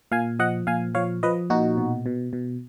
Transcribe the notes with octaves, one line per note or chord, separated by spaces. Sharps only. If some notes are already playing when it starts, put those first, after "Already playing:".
A#2 F5 G#5
F3 D#5 F#5
A#2 F5 G#5
F3 C#5 F5
F3 B4 D#5
A#2 D#4 F#4
B2
B2
B2